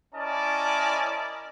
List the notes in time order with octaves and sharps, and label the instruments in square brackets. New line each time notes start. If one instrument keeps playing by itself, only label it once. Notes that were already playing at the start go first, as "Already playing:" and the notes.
[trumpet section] C#4 E4 A#4 D5 D#5 A5